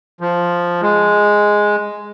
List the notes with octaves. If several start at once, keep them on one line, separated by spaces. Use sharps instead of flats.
F3
G#3